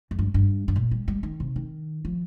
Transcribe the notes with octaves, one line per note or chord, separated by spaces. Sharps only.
F2
G2
G2
G2
A#2
G3
G3
D#3
C3
D#3
F3